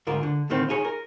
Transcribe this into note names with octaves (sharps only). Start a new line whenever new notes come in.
D2 G#2 F4 A#4
D3
D2 A2 D#3 C4
D#4 F4 G#4 A#4 C#5
A#4